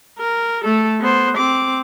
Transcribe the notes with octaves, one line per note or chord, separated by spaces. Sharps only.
A#4
A3 A4
B3 C5
C4 D6